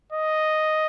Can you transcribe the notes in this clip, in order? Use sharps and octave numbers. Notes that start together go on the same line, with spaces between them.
D#5